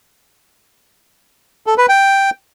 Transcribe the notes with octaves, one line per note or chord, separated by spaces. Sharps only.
A4
B4
G5